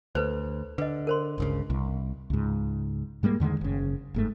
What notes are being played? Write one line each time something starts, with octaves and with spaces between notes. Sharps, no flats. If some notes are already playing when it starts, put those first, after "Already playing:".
D2 A4 B4 C5
D3 B4 D#5
A#4 C5 C6
G1 C#2 C#3
C2
C#2 G#2
G#2 G3 G#3 A#3
E2 D3 D#3 G#3
F#1 C#3
F#1 G#2 A3